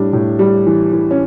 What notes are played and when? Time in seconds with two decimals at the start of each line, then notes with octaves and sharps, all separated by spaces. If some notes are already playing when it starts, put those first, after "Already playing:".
Already playing: A2 G3 D4
0.13 A2
0.39 G3
0.66 E3
0.93 E3
1.11 C#4